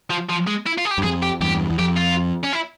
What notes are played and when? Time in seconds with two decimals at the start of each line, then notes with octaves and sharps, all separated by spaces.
0.10 F3
0.30 F3
0.47 G#3
0.67 E4
0.78 F4
0.85 G#4
0.91 G4
0.98 G2
1.03 F2 G#4
1.22 G4
1.41 E2 G2 G4
1.70 E2
1.79 F2 G4
1.96 F4
2.43 C#4
2.52 E4